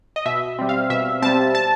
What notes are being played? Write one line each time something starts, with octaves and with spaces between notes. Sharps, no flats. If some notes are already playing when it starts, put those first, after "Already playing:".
D#5
B2 E5
G3 C4
F5
B2 E5
G3 C4 A5
A5